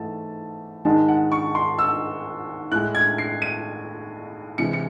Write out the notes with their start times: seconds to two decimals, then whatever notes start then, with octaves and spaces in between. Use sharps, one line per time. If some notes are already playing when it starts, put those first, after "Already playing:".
Already playing: G#2 E3 A3 A5
0.85 G#2 D#3 G#3 A5
1.08 F#5
1.32 C#6
1.55 C6
1.79 E6
2.71 A2 G#3 F#6
2.95 G#6
3.18 C7
3.42 D#7
4.58 C3 E3 G#3 C#7
4.73 C#7